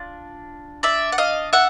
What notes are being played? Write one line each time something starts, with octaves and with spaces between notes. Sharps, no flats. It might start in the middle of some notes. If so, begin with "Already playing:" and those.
Already playing: D4 F4
D5 E5
F#5
D#5 F5
E5 F#5